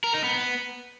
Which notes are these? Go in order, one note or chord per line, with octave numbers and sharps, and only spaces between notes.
A#4
D#4
B3
B3